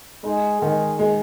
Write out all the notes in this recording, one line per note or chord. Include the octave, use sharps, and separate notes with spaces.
G#3 D#4
D#3 G#3
G#3